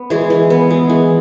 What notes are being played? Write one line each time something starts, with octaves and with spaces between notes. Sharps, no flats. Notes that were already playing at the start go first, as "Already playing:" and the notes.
Already playing: B3
E3 G#3 G#4
E3
B3
G#3
E3